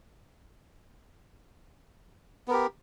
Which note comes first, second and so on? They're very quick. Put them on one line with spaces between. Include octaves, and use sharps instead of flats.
B3 A#4 G4